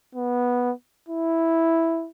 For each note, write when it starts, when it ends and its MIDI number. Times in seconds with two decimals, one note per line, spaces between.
0.15 0.72 59
1.09 2.09 64